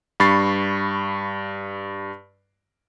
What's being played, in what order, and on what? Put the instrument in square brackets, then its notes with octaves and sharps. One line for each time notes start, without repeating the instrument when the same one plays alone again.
[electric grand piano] G2 B5 C#6 A6 C7